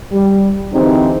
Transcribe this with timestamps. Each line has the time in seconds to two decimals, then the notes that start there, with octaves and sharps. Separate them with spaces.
0.12 G3
0.72 D3 E3 G#3 C4 D#4 G4